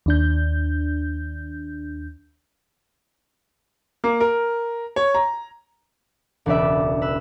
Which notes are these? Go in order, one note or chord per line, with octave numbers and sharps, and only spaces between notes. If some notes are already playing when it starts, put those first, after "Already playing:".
D#2 D4 G6
A#3
A#4
C#5
A#5
E1 C#2 D4 B4 D5 E5
B4 E6